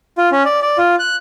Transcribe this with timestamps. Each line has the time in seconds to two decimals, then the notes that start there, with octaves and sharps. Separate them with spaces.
0.18 F4
0.32 C#4
0.45 D5
0.62 D5
0.78 F4
0.99 F#6